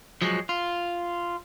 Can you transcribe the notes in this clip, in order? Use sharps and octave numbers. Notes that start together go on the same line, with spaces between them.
F3 F#3 G#3
F4